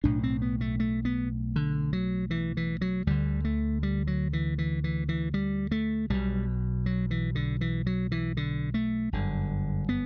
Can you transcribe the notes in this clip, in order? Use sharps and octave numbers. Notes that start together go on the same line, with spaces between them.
B1 A2 D4
C4
B3
A3
A3
B3
D3
F#3
E3
E3
F#3
D2 D3 G3
A3
G3
F#3
E3
E3
E3
E3
G3
A3
B1 B2 G3
F#3
E3
D3
E3
F#3
E3
D3
A3
G1 F#2 D3
B3